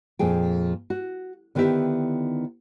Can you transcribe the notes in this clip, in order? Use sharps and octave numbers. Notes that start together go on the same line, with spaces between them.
F2 A#2 F3 G#4 G5
F#4
D3 D#3 B3 E4 G4 E5